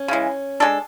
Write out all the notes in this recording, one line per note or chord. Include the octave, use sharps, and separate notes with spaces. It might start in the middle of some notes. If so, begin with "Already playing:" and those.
Already playing: C#4
C#3 E3 G#3
G#3 D4 A4